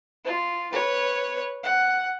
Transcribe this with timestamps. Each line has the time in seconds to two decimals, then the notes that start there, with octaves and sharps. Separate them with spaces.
0.25 F4
0.72 B4 C#5
1.63 F#5